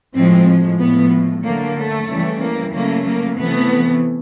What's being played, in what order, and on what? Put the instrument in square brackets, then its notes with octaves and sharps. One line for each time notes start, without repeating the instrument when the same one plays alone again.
[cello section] A2 F3 G#3 C4
A2 F3 G#3 B3
D3 F#3 A3 A#3
A3
C#3 E3 G3
A#3
C#3 F#3 A3 A#3
A#3
C3 E3 A3 B3